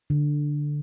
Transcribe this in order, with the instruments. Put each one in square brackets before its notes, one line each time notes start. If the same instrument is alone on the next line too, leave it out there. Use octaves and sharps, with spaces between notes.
[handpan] D3